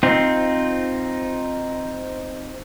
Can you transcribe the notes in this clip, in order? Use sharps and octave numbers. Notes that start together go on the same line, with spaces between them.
C4 D#4 F4